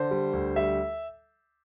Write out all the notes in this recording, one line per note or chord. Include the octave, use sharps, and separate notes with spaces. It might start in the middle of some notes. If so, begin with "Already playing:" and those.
Already playing: D3 C5
G3
D2
G3 E5